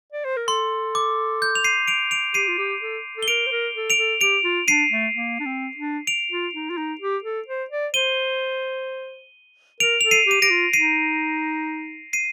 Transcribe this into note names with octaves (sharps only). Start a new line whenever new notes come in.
D5
C5
A#4
A4 C6
D6
G6
F7
C7 D#7
D7 F7
D7 F7
G4 C7 D#7
F4
G4
A4
A4
G7
A#4 D7 F7
C5
A#4
A4
D7 F7
A4
G4 D7 F7
F4
D4 C7 D#7
A3
A#3
D4
C4
D4
D7 F7
F4
D#4
F4
D#4
G4
A4
C5
D5
C5 D#7 G7
A#4 D7 F7
A4 F7
C7 D#7
G4 D#7
G4 A#6 D7
F4
D#4 C7 D#7
C7 D#7